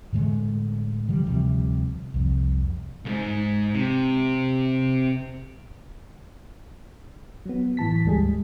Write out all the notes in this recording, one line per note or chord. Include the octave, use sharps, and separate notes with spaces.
A2 D3 G#3 A3
D3 F3 G3
D2 C3 F3 G3
C2 F2
C2 G#2
C3
F#3 B3
A2 E3 A5 B6
D2 G#2 G3 G#3 G#4